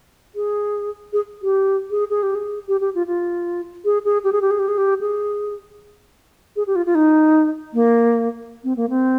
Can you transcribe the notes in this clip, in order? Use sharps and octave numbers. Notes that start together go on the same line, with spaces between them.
G#4
G#4
G4
G#4
G#4
G4
G#4
G4
G4
F4
F4
G#4
G#4
G4
G#4
G4
G#4
G4
G#4
G4
G#4
G#4
G4
F4
F4
D#4
A#3
C4
A#3
C4